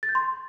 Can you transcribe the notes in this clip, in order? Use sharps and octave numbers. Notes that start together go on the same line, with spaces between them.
A6
G6
C6